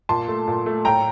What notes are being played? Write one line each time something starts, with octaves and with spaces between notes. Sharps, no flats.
A#2 A5 C6
A3
A#2
A3
A2 G5 A#5